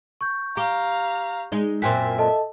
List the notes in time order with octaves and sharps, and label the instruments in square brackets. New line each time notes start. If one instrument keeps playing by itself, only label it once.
[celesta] C#6 G6
[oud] G4 [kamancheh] F5 A#5
[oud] G#3 D#4
[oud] F#2 A#2 C4 [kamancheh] E5 [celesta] G5 G#5 B6
[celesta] A4 D#5 A5